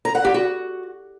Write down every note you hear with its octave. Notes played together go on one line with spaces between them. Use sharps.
A#5
F#5
G4
F#4